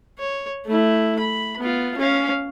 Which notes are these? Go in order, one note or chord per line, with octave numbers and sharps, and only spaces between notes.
C#5
A3 E4
B5
B3 F4
C#4 F5